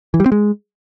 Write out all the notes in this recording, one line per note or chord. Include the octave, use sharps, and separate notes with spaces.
E3
G3
C4
G#3